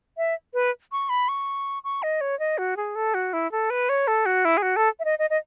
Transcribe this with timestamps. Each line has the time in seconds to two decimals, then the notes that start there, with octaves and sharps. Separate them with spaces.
0.17 E5
0.54 B4
0.92 C#6
1.09 B5
1.29 C#6
1.84 C#6
2.03 D#5
2.21 C#5
2.39 D#5
2.58 F#4
2.77 G#4
2.96 A4
3.14 F#4
3.33 E4
3.52 A4
3.70 B4
3.89 C#5
4.08 A4
4.26 F#4
4.45 E4
4.57 G#4
4.62 F#4
4.76 A4
5.00 E5
5.05 D#5
5.19 D#5
5.30 D#5